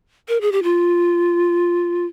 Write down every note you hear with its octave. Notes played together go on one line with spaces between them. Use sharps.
A#4
G#4
G4
F4